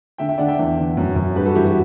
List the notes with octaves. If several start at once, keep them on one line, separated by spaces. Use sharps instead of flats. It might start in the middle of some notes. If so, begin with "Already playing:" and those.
D3 E5 G5
E5 G5
D3 D5 F#5
E5 G5
E2
D3
F#2
F#2
G2 G4 B4
F#4 A4
E3 E4 G4
F#4